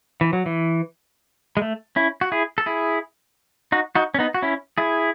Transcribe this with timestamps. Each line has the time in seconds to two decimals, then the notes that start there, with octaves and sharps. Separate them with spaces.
0.21 E3
0.33 F#3
0.46 E3
1.57 G#3
1.62 A3
1.96 C#4 E4
2.21 F#4
2.32 E4 G#4
2.58 A4
2.66 E4 G#4
3.72 D#4 F#4
3.95 D#4 F#4
4.14 C#4
4.19 B3 D#4
4.34 F#4
4.43 C#4 E4
4.78 E4 G#4